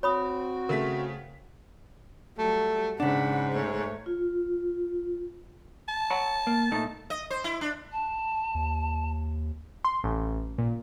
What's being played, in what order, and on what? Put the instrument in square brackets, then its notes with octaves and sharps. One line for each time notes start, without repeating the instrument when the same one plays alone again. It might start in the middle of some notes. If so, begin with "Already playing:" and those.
[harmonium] C4 F#4 [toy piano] C#5 B5 D#6
[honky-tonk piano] C#3 A3 B6 [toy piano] A#4
[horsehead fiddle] F#3 G3 [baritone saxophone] A3
[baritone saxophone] G#2 [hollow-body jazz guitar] C#3 D4 [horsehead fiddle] F#5 B5
[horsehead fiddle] A3 C#5
[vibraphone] F4
[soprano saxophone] A5
[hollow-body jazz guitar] C#5 F#5 A#5
A#3
A#2 A3 D#4
[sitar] D#5
C5
E4
D4
[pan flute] A5
[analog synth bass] D#2
[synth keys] C6
A1
A#2